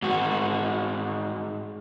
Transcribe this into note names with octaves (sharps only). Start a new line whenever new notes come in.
G#2 F#4